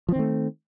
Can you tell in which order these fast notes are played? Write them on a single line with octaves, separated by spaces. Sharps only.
F3 C4 D#3 A3